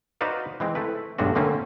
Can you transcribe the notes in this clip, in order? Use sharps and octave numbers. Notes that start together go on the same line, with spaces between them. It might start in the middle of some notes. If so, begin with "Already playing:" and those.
D#4 F#4 B4 C5 D5 F5
E3 G#3 C4
A3 E4 B4
B1 G2 G#3 A3 D4 F#4
D3 A3 A#3 C4 C#4